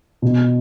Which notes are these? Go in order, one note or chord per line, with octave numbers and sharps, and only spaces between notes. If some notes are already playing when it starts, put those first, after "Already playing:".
B2